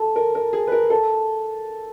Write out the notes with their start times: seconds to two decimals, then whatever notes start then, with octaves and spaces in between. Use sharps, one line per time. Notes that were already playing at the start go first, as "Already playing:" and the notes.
Already playing: A4
0.16 A#4
0.35 A#4
0.53 G#4
0.67 B4
0.72 A#4
0.90 A4